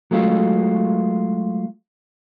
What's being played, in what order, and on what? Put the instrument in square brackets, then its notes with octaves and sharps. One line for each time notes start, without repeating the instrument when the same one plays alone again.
[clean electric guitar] F#3 G#3 A3 F4